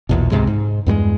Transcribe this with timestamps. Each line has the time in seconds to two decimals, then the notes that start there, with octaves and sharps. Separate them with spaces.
0.09 A#1 E2 B2
0.31 C#2 G#2 C3 G#3
0.47 G#2
0.86 E2 G2 G3 G#3